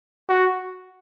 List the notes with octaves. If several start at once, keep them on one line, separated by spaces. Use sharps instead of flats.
F#4